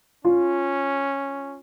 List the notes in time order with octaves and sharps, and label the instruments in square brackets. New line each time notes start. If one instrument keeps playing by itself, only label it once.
[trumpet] C#4 [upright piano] F4